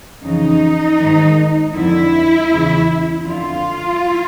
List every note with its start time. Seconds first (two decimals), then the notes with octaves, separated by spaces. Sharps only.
0.23 F2 C#3 E3 D#4
0.99 G#2 D#3
1.75 F2 D3 E4
2.50 E2 C#3 E3
3.26 F2 D3 F4